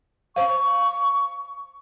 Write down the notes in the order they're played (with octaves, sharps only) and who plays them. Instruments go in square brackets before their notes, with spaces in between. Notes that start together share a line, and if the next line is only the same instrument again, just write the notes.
[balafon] C5 F5 [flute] C#6